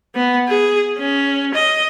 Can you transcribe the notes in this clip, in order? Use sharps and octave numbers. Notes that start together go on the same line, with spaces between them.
B3
G#4
C#4
D#5